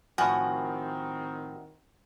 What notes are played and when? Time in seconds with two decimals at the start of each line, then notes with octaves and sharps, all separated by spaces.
0.18 A2 D#3 F3 C4 F#4 G#5